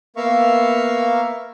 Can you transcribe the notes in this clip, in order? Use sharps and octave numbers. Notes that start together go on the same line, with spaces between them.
A#3 B3 A#4 E5 F5 C#6